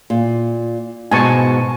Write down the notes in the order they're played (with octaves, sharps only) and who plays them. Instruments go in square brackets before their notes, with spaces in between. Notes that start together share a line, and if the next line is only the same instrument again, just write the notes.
[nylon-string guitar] A#2
[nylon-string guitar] G#2 B2 [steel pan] G#5 A5 C#6